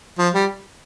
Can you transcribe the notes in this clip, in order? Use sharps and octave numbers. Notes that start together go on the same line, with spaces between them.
F3
G3